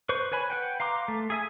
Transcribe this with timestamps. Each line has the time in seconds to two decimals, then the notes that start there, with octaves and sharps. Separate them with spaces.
0.09 B4 C5 C#6
0.32 B4 C#5 G#5 B5
0.50 B4 F#5 G5
0.80 F5 A#5 C6 D6
1.08 A3
1.30 G#4 E5 G#5